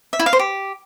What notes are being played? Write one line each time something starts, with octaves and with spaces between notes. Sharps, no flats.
E5
E4
F5
C5
G4